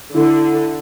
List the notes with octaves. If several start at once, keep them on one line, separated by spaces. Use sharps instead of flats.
D3 E4